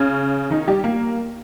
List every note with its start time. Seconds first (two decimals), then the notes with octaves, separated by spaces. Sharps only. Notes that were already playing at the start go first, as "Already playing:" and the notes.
Already playing: C#3 C#4
0.50 D#3 D#4
0.68 G3 G4
0.84 A#3 A#4